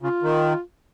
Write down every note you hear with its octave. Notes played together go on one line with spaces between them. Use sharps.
C#3 F4
D#3